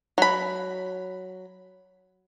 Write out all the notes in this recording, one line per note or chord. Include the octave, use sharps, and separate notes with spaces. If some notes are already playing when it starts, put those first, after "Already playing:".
F#3 B5